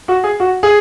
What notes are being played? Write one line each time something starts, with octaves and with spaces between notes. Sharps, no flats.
F#4
G#4
F#4
G#4